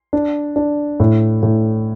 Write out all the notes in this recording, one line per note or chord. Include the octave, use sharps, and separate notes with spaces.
D4
D4
A2
A2